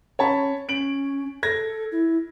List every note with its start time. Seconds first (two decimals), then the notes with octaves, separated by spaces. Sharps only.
0.19 C#4 C#5 A5 B5
0.69 C#4 D7 F#7
1.43 A4 G#6 A#6
1.92 E4